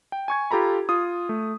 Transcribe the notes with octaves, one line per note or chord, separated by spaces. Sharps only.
G5
G#5 C#6 G#6
F4 G4 A4 A#5 B5
F4 D#6
A3